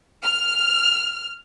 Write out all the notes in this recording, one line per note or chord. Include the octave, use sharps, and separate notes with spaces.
F6